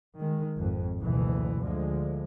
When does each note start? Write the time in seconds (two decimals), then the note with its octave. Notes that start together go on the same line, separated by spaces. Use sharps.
0.18 D#3 G#3
0.58 G#1 F2
1.01 F#1 D2 B2 E3
1.62 D2 D3 F3 G#3